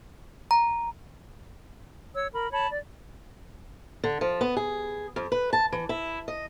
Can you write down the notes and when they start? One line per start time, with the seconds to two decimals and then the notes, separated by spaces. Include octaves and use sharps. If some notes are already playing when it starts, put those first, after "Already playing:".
0.51 A#5
2.15 C#5 E6
2.33 A#4 B5
2.52 C#5 A5 B5
2.69 D5
4.04 D3
4.21 F3
4.41 B3
4.57 G#4
5.16 F2
5.32 B4
5.53 A5
5.72 E3
5.89 E4
6.28 D#5